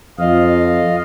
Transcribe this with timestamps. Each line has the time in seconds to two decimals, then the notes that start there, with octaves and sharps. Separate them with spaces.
0.19 F2 F4 D#5 F5